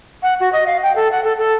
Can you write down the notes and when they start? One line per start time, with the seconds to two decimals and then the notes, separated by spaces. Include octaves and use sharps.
0.22 F#5
0.40 F#4
0.52 D#5
0.66 F5
0.83 G5
0.95 A4
1.11 F#5
1.24 A4
1.38 A4